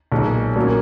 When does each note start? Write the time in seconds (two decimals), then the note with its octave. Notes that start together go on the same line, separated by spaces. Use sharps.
0.12 B1 A#2 G#3
0.56 A#1 A#2 F#3 A#3 C#4